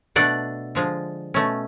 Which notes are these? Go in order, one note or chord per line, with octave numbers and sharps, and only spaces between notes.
B2 A3 D4 D5 F#5
D3 F3 G#3
B2 A3 C#4